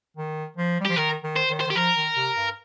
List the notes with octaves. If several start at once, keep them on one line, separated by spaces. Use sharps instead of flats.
D#3
F3
G3
F3 G4
D#3 A#4
D#3
C5
D#3
C5
D#3 G4
F3 A#4
D#3
C3
G2